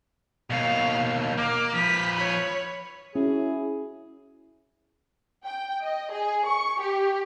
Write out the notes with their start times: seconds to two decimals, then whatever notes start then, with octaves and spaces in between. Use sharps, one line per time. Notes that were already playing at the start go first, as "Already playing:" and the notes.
0.50 D#2 B2 F5
1.37 A#3 D6
1.74 F3 B4 B6
2.15 C#5 B5
3.15 C#4 E4 F#4 G#4
5.45 G5
5.83 D#5
6.13 G#4
6.48 C#6
6.82 G4